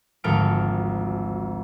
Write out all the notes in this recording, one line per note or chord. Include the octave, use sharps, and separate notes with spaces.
G#1 D2 F3 A4 F6 D7